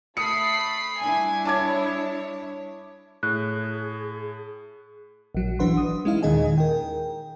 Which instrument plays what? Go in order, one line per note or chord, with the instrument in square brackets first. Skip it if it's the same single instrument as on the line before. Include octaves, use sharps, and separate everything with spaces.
[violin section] A3 B5 C7 [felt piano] D#6 C#7
[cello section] G3 D4 E4 [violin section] G#5
[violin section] C#5 [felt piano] A5 D6 G#6
[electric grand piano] A2 [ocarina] G#4 [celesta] F#6
[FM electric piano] A#1 F#3
G1 E3 D4 B4 F#5 C6
D#6
G#3 C#4 D#4 E4 F5
D#2 A#2 D#3 G#4 D#5 G#5
A#4 G5